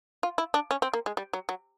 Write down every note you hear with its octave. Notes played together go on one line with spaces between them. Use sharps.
F4
E4
D4
C#4
C4
A#3
G#3
G3
F#3
F#3